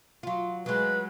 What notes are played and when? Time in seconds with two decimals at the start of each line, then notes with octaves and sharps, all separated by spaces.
0.23 F#3 F4
0.66 F#3 G#3 B4